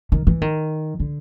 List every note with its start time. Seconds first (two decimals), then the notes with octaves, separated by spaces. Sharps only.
0.12 D#3
0.27 E3
0.41 D#3
1.00 D3